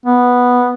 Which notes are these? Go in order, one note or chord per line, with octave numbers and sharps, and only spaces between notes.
B3